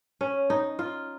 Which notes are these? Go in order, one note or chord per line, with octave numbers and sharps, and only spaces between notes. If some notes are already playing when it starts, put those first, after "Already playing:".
C#4
D#4
F4